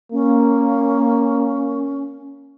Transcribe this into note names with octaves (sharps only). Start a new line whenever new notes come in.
A#3 C#4